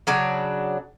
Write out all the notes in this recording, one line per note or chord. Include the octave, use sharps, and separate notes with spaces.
C#3 F#3 D4